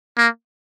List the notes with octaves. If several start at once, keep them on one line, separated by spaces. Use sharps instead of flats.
A#3